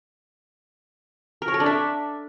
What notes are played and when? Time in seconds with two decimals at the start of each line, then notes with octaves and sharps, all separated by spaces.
1.42 A#4
1.48 C#5
1.54 A4
1.60 D4
1.66 E5